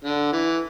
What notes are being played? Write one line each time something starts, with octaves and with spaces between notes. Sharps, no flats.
D3
E3